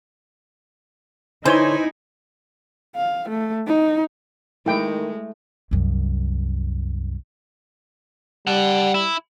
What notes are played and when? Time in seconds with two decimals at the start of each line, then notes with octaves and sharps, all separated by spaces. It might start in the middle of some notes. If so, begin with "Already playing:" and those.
1.45 D3 E3 D#4 E4 C5 C#5 G#5 C6
2.96 F5
3.29 A3
3.67 D#4
4.66 D#3 G#3 A3 E4 G5
5.71 C2 F#2
8.47 G3 F#5 A5
8.94 E4